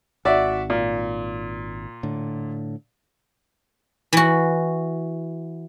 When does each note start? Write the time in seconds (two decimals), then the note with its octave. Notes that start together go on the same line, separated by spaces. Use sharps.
0.25 G#1 F#4 D5 E5
0.70 A#2
2.03 A2 D3
4.13 E3 F#4